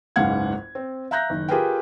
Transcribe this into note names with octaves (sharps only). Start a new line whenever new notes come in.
F#1 C#2 G#2 F5 F#5 G#6
C4
E5 F5 A#5 F#6 G6 A#6
F#1 D#3
F4 G4 G#4 A#4 B4 G5